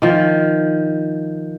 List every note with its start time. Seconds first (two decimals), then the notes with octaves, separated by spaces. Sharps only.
0.02 D#3 F3